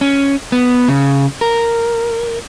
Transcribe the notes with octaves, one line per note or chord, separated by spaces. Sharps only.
C#4
B3
C#3
A#4